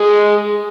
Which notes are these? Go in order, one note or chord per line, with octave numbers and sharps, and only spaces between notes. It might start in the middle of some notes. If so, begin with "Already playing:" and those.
Already playing: G#3